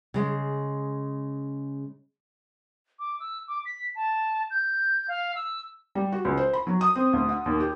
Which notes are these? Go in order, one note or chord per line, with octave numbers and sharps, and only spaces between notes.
C#3 G#3
D6
E6
D6
B6
A5
G6
F5
E6
G3
F#4
C#2
C5
B5
F#3
D#6
C4
D2
F#5
D#2
G4